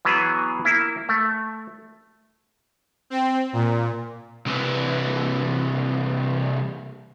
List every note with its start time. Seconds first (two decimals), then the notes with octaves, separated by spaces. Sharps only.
0.05 E3 F#3 B3 G#4
0.65 A#3 E4
1.09 A3
3.10 C4
3.53 A#2
4.46 C2 E3